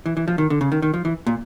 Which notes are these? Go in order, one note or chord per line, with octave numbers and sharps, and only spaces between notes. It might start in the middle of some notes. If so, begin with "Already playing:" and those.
E3
E3
F3
D#3
D3
C#3
D#3
D#3
F3
E3
A#2